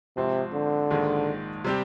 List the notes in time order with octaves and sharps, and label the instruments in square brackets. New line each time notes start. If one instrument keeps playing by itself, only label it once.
[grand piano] G#1 G#2 F3 C4 [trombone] C3
[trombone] D3
[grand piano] A#1 G#2 D#3 G#3
C3 G3 C4 G4